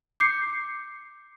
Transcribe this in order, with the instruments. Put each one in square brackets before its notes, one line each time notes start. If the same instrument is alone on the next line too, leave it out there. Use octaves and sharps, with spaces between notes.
[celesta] D6 G6 C7 C#7